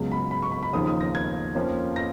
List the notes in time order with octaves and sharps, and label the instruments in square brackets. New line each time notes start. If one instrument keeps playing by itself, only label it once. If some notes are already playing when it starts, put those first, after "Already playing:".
Already playing: [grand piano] C#2 C#3 F#3 B3
[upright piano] B5
B5
C#6
B5
B5
[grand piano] D#2 C#3 F3 A#3 D#4 [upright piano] D#6
[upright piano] D#6
A#6
G#6
[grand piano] F2 F3 A#3 C#4
[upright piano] A#6